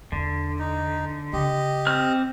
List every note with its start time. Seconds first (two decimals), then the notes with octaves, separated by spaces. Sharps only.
0.12 E2 D3
0.59 D#4
1.33 C#3 G4 D#5
1.87 C4 F6